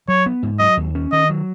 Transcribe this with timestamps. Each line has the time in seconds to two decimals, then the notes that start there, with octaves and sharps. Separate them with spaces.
0.08 F#3 C#5
0.26 B3
0.43 G#2
0.60 F#3 D#5
0.77 D#2
0.95 C#4
1.12 D#3 D#5
1.29 F#3